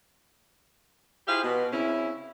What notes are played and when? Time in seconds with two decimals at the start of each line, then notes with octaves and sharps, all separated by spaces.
1.27 E4 F4 G4 G#4 C5 F5
1.44 B2
1.72 C#3 C4 C#4 E4